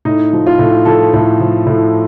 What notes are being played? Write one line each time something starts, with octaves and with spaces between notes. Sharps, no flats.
A2 D#4
F3
F4
A2
F3 A4
A2
F3
A2